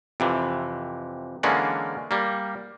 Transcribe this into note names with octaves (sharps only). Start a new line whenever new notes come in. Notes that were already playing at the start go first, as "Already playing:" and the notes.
F2 C3 E3
D3 E3 G#3 A#3 C#4 D5
G3 A#3